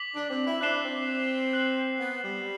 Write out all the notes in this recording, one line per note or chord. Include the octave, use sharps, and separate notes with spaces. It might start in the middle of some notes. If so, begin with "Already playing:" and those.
Already playing: D6 B6 F#7
D4
C4
E4
D4 F#6 C7 E7 G7
C4
F#6 C7 F#7
B3
G3